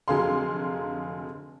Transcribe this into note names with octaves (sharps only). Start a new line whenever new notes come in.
F1 D3 F#3 G#4 F5 C6